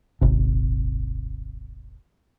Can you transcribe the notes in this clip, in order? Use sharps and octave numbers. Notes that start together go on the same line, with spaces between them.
D#1 G#1 C3